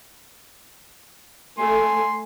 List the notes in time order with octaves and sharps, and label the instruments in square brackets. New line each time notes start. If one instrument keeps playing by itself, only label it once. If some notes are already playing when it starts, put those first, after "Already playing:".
[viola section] A3 [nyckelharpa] G#5 [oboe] C6